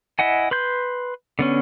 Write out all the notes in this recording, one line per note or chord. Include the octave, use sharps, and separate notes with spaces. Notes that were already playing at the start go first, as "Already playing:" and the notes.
E4 D#5 F#5 G#5
B4 C6 G6
D3 B3 C#4